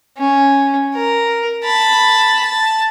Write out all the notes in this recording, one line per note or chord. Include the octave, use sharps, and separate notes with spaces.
C#4
A#4
A5 B5
A5